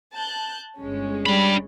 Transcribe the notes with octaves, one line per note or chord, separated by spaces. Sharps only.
A5 F#6 G6
G1 G#3 C#4
G3 D4 B5